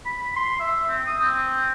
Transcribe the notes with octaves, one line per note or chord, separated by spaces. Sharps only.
B5
C6
E5
C4
D#6
C4